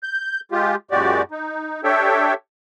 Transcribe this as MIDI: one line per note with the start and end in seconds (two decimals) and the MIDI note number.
0.03 0.40 91
0.52 0.75 56
0.52 0.75 65
0.52 0.75 67
0.91 1.22 42
0.91 1.22 46
0.91 1.22 56
0.91 1.22 66
0.91 1.22 67
0.91 1.22 74
1.31 1.81 63
1.84 2.34 62
1.84 2.34 67
1.84 2.34 69
1.84 2.34 73
1.84 2.34 76
1.84 2.34 79